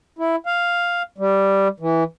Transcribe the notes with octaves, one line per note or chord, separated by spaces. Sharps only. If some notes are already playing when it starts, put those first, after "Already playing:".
E4
F5
G3
E3